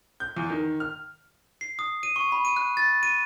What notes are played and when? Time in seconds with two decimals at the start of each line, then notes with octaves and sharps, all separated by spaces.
0.20 G6
0.36 E2
0.50 D#3
0.80 F6
1.61 C7
1.79 D#6
2.03 D#7
2.16 C#6
2.32 B5
2.45 D#7
2.57 F#6
2.77 A6
3.03 D#7